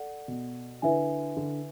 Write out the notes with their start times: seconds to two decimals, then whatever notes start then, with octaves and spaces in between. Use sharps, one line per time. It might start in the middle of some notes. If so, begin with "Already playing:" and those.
Already playing: A4 D5 F#5
0.28 B2
0.82 D3 E4 B4 E5 G#5
1.37 D3